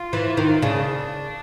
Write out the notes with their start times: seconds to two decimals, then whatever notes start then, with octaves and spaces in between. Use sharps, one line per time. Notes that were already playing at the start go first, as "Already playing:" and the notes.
Already playing: F4
0.13 E3
0.37 D#3
0.62 C#3 D4